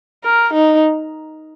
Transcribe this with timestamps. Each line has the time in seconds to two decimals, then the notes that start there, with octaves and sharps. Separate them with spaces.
0.24 A#4
0.54 D#4